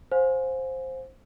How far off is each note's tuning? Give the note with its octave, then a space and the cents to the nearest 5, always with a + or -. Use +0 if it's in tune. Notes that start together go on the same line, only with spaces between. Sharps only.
C5 +10 F5 +45 G#5 +0